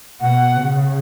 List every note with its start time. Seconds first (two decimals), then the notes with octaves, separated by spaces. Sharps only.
0.21 B2 F#5
0.56 C#3